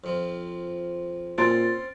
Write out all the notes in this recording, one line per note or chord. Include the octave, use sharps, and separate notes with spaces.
F2 F3
A#2 C4 C#4 C6 A6 D7